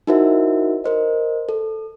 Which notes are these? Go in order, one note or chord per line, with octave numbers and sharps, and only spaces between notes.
D#4 E4 F#4 A#4 C5 E5
A#4 C5 D#5
A4